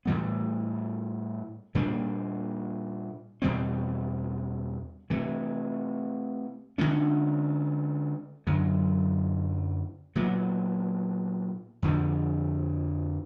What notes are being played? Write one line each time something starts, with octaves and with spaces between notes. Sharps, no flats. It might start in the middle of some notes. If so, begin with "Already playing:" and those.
A2 E3 G3 B3
A#2 G3 A#3 D4
E2 B2 G3 C4
C3 E3 A3
D3 F3 G#3 C#4
F#2 D3 F#3
A#2 F#3 B3
F2 D3 F3